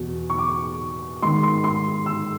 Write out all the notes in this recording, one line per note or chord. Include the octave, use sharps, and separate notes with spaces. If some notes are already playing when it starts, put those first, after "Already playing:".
Already playing: E2 B2
C#6
D6
G#2 D#3 C6
C6
C6
E6